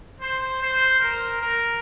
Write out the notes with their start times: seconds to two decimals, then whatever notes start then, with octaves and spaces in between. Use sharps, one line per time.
0.21 C5
0.61 C5
1.00 A#4
1.41 A#4